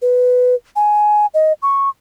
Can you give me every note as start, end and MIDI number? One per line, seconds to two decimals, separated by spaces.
0.02 0.55 71
0.76 1.26 80
1.34 1.53 75
1.62 1.89 85